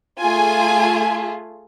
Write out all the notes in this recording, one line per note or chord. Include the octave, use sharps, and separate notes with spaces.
A3 F4 G#4 G#5